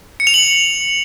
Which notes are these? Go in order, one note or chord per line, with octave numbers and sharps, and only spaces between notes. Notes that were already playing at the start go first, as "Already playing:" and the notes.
C#7
F7
F#7